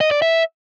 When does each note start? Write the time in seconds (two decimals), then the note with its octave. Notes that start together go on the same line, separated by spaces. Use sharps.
0.01 D#5
0.11 D5
0.22 E5